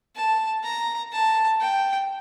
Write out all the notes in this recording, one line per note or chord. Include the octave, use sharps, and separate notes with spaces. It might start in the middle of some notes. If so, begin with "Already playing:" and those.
A5
A#5
A5
G5